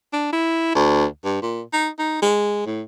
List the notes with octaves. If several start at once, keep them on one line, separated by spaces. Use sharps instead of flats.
D4
E4
D2
G2
A#2
D#4
D#4
G#3
A2